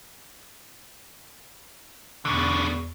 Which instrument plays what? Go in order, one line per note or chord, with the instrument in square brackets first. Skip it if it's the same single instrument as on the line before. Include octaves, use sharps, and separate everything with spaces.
[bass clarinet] E2 [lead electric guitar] B2 D3